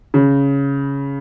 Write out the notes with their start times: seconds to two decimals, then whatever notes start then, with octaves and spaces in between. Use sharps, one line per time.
0.14 C#3